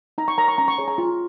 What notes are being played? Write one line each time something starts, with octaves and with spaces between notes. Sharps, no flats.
D#4 A#5
C#6
A#4 C#5 A#5
C#6
C#4 A#5
C#6
G#4 C#5
A#5
F4